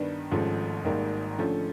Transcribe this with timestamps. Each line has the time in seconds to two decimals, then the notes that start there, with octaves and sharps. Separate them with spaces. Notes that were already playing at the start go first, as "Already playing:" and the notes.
Already playing: G2 D#3 G3 B3
0.31 G#1 G#2 F3 A3 C#4
0.84 G#1 G#2 D#3 G3 A#3
1.38 D3 F3 A3 C#4